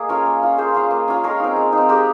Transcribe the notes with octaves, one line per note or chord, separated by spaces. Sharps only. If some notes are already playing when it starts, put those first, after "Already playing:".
Already playing: A#3 G#4 D#5
C#4 F4 A#4 C#5
A#3
C#4 F4
A#3 G#4 C5
C#4 F4
A#3
C#4 F4
G#3 A#4 C#5
C4 D#4
G#3
D#4
C4
G#3 G4 A#4